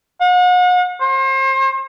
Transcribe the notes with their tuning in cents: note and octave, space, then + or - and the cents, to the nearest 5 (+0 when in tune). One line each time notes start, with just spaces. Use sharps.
F#5 -40
C5 +35